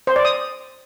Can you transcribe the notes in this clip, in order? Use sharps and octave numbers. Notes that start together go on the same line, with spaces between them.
C5
D5
D#6